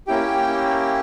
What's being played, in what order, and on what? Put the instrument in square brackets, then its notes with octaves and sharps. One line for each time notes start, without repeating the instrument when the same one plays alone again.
[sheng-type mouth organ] A#3 C#4 E4 G4 G5